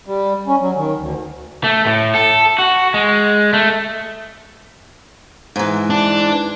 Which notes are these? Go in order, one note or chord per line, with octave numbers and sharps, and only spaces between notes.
G3
C#4
F#3
D#3
D2
A3
A2
A4
F#4
G#3
A3
G#2 E3
D4